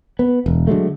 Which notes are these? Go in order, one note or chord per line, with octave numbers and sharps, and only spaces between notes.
B3
E1
D3 F#3 G#3 A3